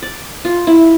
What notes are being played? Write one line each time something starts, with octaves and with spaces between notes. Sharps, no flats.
D5
F4
E4